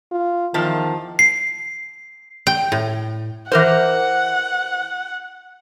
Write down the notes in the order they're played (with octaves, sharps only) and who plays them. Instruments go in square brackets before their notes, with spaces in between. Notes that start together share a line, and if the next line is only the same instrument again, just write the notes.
[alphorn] F4
[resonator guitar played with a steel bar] E2 F3 A5 [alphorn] D#3
[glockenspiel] C7
[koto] G5
A2
[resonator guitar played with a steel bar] E3 A#4 C5 [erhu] F#5